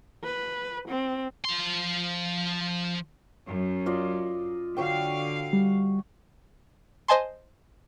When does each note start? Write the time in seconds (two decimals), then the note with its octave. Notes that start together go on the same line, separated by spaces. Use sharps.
0.23 B4
0.88 C4
1.45 F3 C6
3.47 F#2
3.86 F4 D5 D#5
4.77 D3 F#4 C#5 F5 G5
5.53 G3
7.08 C5 D#5 G#5 A5 C6